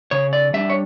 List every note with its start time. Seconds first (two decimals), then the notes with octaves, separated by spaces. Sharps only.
0.11 C#3 C#5
0.33 D5
0.54 G3 D4 E5
0.70 C#5